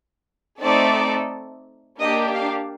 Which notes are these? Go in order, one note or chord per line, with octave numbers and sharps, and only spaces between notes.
A3 C4 D#4 A4 D5
A#3 D4 G4 D#5
F5